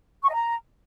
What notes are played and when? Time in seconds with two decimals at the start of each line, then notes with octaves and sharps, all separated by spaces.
0.23 C#6
0.28 D#5
0.34 A#5